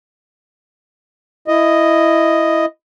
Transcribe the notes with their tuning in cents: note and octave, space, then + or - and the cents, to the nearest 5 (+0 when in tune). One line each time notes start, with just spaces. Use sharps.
E4 +10 D#5 +0